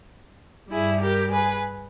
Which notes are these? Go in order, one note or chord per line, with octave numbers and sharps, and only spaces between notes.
G2 G3 E4 G#4
G4 A#4
G#4 B4